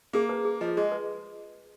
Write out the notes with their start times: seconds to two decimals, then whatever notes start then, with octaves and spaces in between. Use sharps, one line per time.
0.13 A#3 G#4
0.29 B4
0.45 G#4
0.61 F3 D#5
0.77 G#3 G#4
0.92 B4